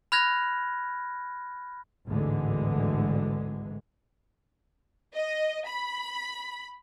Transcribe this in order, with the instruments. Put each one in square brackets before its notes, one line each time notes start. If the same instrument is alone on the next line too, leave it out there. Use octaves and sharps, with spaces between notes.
[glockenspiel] B5 F6 F#6 G#6 A#6
[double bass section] G#1 D2 A2 D3 E3 G#3
[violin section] D#5
B5